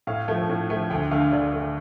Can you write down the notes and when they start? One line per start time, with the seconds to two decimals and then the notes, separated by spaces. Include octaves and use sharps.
0.07 A2 F5
0.28 F3 A3
0.50 A2
0.69 F3 A3
0.90 D2 G5
1.11 D3 A3 F5
1.32 D2 D5
1.53 D3 A3